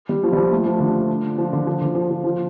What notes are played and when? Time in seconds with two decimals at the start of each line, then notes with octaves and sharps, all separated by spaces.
0.09 G3
0.24 F3
0.33 G3
0.37 F3
0.52 A3
0.66 F3
0.80 D3
1.38 F3
1.53 D3
1.67 F3
1.81 D3
1.95 F3
2.10 F3
2.24 F3